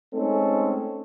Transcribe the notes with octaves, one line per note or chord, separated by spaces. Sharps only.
G#3 A3 C4 C#4 D#4 A4